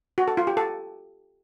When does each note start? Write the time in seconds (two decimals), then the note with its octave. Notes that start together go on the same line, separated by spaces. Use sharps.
0.18 F#4
0.28 A4
0.37 F4
0.47 G4
0.57 A4